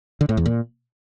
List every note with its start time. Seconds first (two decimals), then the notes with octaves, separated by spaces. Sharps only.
0.21 D3
0.29 A2
0.37 E2
0.46 A#2